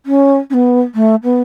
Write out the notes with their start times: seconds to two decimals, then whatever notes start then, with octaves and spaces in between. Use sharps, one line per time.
0.06 C#4
0.50 C#4
0.54 B3
0.95 A3
1.23 B3